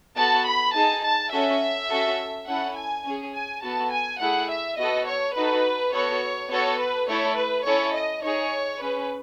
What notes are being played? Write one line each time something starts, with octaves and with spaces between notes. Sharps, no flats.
B3 F#4 A4 A5
B5
D#4 G#4 A5
A5
C#4 F#4 A4 E5
C#4 F#4 A4
C#4 E4 A4 F#5
G#5
C#4 G#4
G#5
B3 F#4 A4 A5
G#5
A3 E4 G#4 F#5
E5
B3 F#4 A4 D#5
C#5
D#4 F#4 A4 B4
B3 F#4 A4 C#5
B3 F#4 A4 C#5
B4
A3 E4 A4 C#5
B4
C#4 E4 A4 C#5
D#5
D#4 G#4 C#5
C#4 G#4 B4